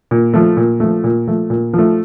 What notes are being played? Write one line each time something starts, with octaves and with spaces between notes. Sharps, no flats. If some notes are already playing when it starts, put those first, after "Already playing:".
A#2
F3 A3
A#2
F3 A3
A#2
F3 A3
A#2
F3 A3